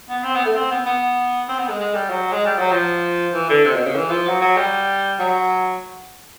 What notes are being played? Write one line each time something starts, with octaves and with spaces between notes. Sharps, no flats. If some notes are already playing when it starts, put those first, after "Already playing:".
B3
C4
B3
A3
C4
B3
B3
C4
B3
G#3
G#3
G3
F#3
G#3
G3
F#3
F3
E3
D3
C3
B2
C#3
E3
F3
F#3
F#3
G3
F#3